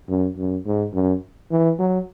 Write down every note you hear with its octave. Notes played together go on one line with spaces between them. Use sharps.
F#2
F#2
G#2
F#2
E3
F#3